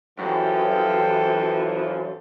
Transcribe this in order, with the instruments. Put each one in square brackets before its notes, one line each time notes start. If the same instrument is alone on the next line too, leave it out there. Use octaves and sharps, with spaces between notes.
[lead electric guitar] F#2 [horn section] E3 F3 [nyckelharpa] G4 A4 [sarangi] G5